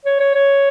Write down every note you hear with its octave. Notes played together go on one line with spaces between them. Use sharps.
C#5
C#5
C#5